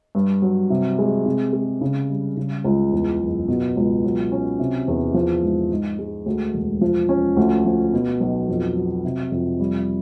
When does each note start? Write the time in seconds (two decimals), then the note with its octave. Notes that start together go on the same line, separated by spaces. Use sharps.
0.15 G2
0.42 F#3
0.70 C3
0.99 G#3
1.26 C3
1.53 G#3
1.81 C#3
2.10 G3
2.37 C#3
2.64 C#2
2.92 E2
3.21 F#1
3.48 B2
3.76 C#2
4.04 F#3
4.32 C#4
4.59 C3
4.88 E2
5.14 F3
5.42 G#2
5.71 G#2
5.99 G#3
6.26 D2
6.54 E1
6.81 F3
7.09 C#4
7.37 D2
7.65 F3
7.93 B2
8.21 B1
8.49 F2
8.76 F#3
9.04 C3
9.32 F2
9.60 G3